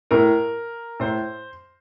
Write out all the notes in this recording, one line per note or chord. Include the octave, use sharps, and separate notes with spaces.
A2 A#4
A2 C5